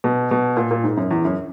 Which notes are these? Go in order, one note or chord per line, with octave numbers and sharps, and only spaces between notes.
B2
B2
A#2
A#2
G#2
F#2
E2
F#2